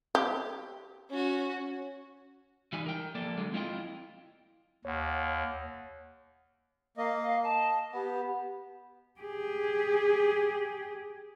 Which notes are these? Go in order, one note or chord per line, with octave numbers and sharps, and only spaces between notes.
G4
C#4 F#4
E3 G3 D#4 G#5
A#4 G5
F3 A#3 A4 D5
D3 F#3 G#3
C4 E4 F4 C5 D#5 G5
D#2 C#5 F#5
A#3 D#5 F5
D#5 A5
B3 G4
G4 G#4